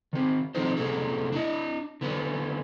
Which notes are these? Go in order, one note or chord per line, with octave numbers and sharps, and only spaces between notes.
D#3 C4
D#3 F3 A3 C4 D#4 C5
C3 E3 A#3 C#4 G#4 A4
D4 E4 D#5
D3 B3 C#4